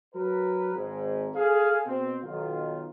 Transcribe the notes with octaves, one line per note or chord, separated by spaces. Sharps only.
F#3 F#4 A#4 B4
G#1 G#2
G#4 A4 F5
B2 C4
B1 D#3 F4